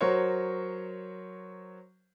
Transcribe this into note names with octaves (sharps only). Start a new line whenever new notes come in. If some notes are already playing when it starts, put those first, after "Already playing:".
F#3 F#4 A#4 C5 C#5